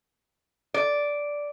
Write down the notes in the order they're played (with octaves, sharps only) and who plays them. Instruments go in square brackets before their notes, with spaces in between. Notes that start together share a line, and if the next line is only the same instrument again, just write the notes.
[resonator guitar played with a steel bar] D5